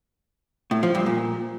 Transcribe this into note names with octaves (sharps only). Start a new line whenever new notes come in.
A2
F3
G2
A#2